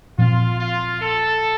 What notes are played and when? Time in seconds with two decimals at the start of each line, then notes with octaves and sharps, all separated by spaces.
0.18 A#2 F3 C4 F4
0.60 F4
1.00 A4